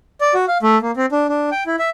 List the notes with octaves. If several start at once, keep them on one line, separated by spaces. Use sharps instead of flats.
D5
F#4
F5
A3
A#3
C4
D4
D4
G5
E4
E5